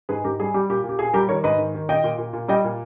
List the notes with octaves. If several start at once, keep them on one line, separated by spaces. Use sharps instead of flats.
G#2 G#4 B4
G#2 G4 A#4
G3 G#4
G3 G4
A#2 G4
A#2
G4
A#2 G#4
G3 G4 A#4
D#3 A#4 C#5
G#2 B4 D#5
D#3
D#3
A#2 D#5 G5
A#2
A#2
A#2
G3 D#5 G5
A#2